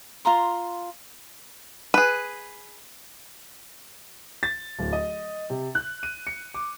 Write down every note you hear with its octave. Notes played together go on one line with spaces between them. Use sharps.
F4 F5 A#5 C6
G#4 B4
A6
D1
D#5
C3
F#6
D#7
C#7
D6